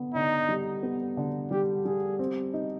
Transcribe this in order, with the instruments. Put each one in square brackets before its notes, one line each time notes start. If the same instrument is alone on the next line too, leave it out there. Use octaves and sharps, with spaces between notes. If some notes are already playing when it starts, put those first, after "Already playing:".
Already playing: [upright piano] D3 B3
[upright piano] D3 [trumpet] D#4
[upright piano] G3
B3
D3
[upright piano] G3 [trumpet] G4
[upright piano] G3 [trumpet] G#4
[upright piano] C4
D#4